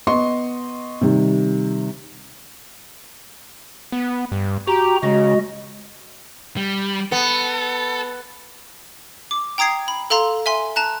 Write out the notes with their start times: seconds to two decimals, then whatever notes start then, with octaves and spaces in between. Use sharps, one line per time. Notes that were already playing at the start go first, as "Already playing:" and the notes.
0.07 B3 D#5 C6 C#6
1.01 C3 D#3 G3
3.92 B3
4.32 G2
4.67 F#4 G4 A#5
5.03 C#3 G#3 F#4 D#5
6.57 G3
7.12 B3 A4
9.31 D6
9.58 G5 A#5 D#6 G#6 C7
9.88 B5
10.10 A4 F5 A#5 C6
10.46 E5 G#5 C6
10.76 A5 A#5 F#6